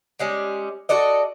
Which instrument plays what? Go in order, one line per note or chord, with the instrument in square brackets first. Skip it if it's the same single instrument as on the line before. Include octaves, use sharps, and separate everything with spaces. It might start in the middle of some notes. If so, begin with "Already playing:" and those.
[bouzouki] G3 G#3 C#4
F#4 A4 D5 D#5